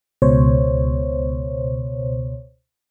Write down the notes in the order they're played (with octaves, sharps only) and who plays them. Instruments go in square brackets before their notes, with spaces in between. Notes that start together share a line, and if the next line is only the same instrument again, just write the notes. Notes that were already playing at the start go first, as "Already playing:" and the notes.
[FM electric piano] C#2 B2 C5 C#5